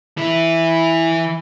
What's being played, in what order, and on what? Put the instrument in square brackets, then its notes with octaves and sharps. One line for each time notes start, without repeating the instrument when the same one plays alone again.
[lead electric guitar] E3 E4